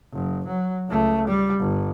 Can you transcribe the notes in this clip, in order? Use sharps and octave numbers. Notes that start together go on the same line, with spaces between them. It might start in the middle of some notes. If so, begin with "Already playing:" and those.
F#1
F#3
C#2 A3
G3
G1